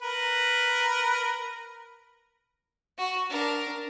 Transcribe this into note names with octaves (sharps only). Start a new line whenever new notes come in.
A#4 B4
F#4
D4 A#4